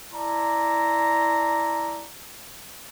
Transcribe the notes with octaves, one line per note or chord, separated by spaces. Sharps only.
E4 D5 A5 A#5 C6